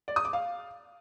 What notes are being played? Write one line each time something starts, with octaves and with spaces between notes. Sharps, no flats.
D5
D#6
D6
F5